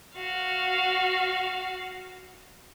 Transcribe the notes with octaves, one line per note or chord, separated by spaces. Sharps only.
F#4 F5